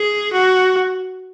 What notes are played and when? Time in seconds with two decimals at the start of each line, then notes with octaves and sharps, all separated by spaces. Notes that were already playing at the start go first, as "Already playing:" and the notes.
Already playing: G#4
0.33 F#4